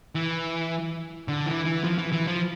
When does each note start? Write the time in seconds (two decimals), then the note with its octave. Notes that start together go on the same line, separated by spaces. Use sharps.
0.15 E3
1.28 D3
1.46 E3
1.65 E3
1.84 F3
1.98 E3
2.13 E3
2.27 F3